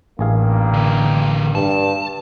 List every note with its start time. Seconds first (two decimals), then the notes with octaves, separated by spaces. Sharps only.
0.19 A1 G2 A#3 G#4 F5
0.73 D3 A#4
1.55 G2 A5